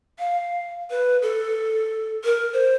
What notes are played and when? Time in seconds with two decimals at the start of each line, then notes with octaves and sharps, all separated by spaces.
0.19 F5
0.90 B4
1.22 A4
2.24 A#4
2.53 C5